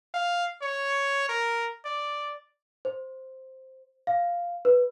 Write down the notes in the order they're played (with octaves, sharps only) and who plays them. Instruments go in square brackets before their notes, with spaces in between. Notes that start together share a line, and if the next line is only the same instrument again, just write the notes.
[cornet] F5
C#5
A#4
D5
[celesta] C5
F5
B4